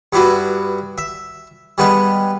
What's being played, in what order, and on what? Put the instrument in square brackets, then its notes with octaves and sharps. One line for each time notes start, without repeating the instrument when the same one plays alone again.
[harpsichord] G2 B3 D4 E4 F#4
E5
G3 G#3 B3 B4